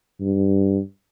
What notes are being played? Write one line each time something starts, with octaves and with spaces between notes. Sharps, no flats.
G2